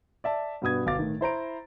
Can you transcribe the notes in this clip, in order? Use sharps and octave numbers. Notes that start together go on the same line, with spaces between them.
D5 E5 A5
G2 B2 B3 D#6 G#6
G1 B2 F5 D6 A6
A2 D#3
E4 C5 A#5 D7